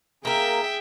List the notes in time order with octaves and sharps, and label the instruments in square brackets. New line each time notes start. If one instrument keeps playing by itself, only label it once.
[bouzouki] A#3 A#4 [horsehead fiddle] G#4 [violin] E5 G5